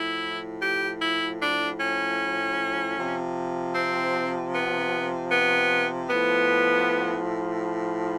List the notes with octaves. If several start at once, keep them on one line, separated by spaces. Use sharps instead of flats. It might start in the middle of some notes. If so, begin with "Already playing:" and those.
Already playing: A2 F3 E4
G4
E4
D4
C#4
C3 F3
C4
B3
B3
A2 F3 B3